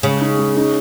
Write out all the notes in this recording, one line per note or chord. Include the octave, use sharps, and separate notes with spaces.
C#3 G#3
D#4
G#3
D#4